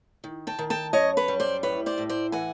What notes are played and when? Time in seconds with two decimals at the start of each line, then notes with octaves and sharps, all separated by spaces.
0.24 D#3
0.47 G5 A5
0.59 D#3
0.70 G5 A5
0.93 F#2 C#5 D#5
1.17 B4 C#5
1.28 G3
1.40 C5 D5
1.63 A2 B4 C#5
1.86 C5 D5
1.98 A2
2.09 C5 D5
2.32 E3 F#5 G#5